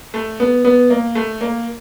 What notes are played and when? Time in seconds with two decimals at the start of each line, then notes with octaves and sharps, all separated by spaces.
0.14 A3
0.40 B3
0.65 B3
0.90 A#3
1.15 A3
1.41 A#3